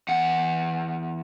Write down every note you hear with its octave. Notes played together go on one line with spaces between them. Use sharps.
E2 F#5